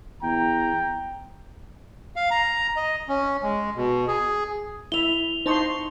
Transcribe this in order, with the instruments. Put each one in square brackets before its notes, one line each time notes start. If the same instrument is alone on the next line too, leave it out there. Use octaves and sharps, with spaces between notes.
[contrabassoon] E2 [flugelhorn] G5 [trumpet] A#5
[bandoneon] F5
A#5
D#5
C#4
G#3
B2
G#4
[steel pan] E4 E5 [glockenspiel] F7 G7
[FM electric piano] D#4 A5 C#6 [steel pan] C5 D#5 C6